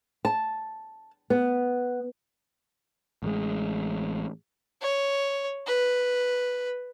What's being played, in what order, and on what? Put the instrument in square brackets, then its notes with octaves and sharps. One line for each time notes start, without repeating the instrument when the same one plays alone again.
[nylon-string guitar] A5
B3
[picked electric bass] A1 G#3
[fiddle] C#5
B4